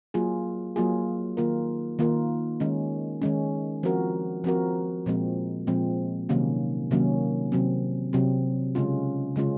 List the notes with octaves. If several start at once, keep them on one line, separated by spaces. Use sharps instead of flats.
F#3 A#3 F4 G#4
F#3 A#3 F4 G#4
D#3 A#3 F4 A#4
D#3 A#3 F4 A#4
D#3 G#3 C#4
D#3 G#3 C#4
F3 C4 F#4 A#4
F3 C4 F#4 A#4
A#2 F3 G#3 C4
A#2 F3 G#3 C4
C3 D#3 F#3 A#3 C#4
C3 D#3 F#3 A#3 C#4
C3 F#3 C4
C3 F#3 C4
C#3 G#3 C#4 F4
C#3 G#3 C#4 F4